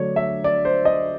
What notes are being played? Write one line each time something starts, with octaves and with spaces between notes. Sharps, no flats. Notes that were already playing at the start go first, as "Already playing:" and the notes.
Already playing: D3 F#3 A3 C#5 D5
E5
D5
C5
D#5